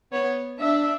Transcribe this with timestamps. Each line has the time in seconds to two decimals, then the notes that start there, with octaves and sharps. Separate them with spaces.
0.12 B3 C#5
0.60 D4 E5